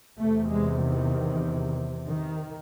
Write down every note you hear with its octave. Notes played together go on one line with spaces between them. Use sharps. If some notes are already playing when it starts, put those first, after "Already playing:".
E2 C3 A3
G#3
D#3
D#3